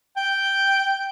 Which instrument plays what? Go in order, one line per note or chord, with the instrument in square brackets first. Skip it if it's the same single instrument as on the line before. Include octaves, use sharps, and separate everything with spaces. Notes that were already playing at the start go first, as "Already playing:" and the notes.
[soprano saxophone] G5